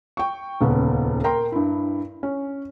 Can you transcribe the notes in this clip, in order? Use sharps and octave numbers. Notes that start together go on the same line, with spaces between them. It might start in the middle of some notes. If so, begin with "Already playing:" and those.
G5 C#6
D#1 C#2 B3
A#4 G5 A#5 C6
G2 E4
C#4